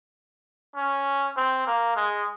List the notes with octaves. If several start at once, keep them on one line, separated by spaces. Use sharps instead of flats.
C#4
C4
A#3
G#3